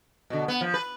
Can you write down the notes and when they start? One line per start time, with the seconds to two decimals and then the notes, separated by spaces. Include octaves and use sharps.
0.30 B2 D3
0.48 B3
0.61 F3
0.74 B4